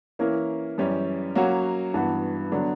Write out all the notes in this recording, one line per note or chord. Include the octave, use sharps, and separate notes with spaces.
E3 A#3 C#4 E4 A#4
F#2 E3 G3 C#4 G4
F#3 A#3 C#4 F#4
G2 E3 B3 F#4
D3 F#3 B3 D4